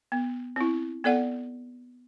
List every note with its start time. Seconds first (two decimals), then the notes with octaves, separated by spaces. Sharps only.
0.12 B3
0.56 C4 E4
1.04 B3 A4 D5 F#5